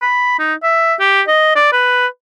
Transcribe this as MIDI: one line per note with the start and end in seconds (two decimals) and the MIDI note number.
0.02 0.38 83
0.39 0.54 63
0.63 0.94 76
1.00 1.22 67
1.28 1.55 75
1.56 1.72 74
1.72 2.07 71